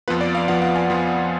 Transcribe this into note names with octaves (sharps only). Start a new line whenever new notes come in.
F2 F3 B3 F4 B4
D5
F5
F2 F3 B3 F4 F#5
F#5
G#5
F2 F3 B3 F4